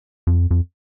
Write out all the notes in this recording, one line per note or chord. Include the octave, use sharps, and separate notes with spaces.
F2
F2